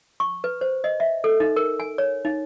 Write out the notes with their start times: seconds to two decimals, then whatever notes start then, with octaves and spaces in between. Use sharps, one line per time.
0.20 C#6
0.44 B4
0.61 C5
0.84 D#5
1.00 E5
1.24 A4
1.40 D#4
1.56 A#4
1.80 G#5
1.98 C#5
2.25 D#4